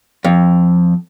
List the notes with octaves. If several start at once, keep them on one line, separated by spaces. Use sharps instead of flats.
F2